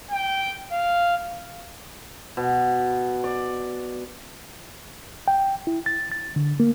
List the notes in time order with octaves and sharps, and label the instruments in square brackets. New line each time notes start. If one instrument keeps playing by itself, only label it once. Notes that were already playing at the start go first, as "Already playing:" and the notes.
[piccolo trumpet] G5
F5
[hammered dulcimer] B2
D5
[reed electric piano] G5
E4
A6
A6
D3
A#3